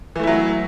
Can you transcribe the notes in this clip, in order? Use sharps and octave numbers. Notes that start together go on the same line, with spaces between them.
E3 F#3 A3 E4